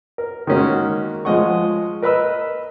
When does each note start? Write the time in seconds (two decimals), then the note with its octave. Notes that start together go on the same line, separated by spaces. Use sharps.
0.18 A#4
0.47 D#3 G#3 A#3 C#4 F#4
1.25 F3 G#3 D#5 F#5 C#6
2.02 A#4 B4 D#5 B5 E6